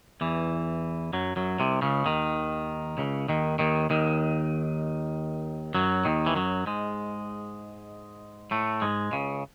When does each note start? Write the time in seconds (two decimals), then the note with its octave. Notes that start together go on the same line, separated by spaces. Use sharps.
0.21 E2 E3
1.13 F#2 F#3
1.36 F#2 F#3
1.60 C2 C3
1.82 C#2 C#3
2.06 D#2 D#3
2.98 C#2 C#3
3.28 D#2 D#3
3.59 D#2 D#3
3.90 D#2 D#3
5.75 F#2 F#3
6.05 D#2 D#3
6.26 E3
6.36 F#2 F#3
6.66 G#2 G#3
8.51 A2 A3
8.82 G#2 G#3
9.12 C#2 C#3